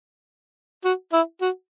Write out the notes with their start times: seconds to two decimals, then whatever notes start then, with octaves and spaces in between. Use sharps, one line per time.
0.84 F#4
1.13 E4
1.41 F#4